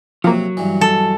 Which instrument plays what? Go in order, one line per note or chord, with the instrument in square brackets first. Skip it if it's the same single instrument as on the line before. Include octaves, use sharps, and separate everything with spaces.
[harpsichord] C3 [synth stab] F3 A#3 [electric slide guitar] F#3
[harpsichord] G2 E3
[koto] A4